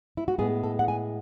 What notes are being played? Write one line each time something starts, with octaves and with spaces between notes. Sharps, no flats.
E4
F#4
A2 G#3 B3 G#4
A4
F#5
G#5